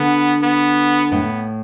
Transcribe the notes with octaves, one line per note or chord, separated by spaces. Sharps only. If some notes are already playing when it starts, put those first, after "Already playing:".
Already playing: D3 B3
B3
A2 B3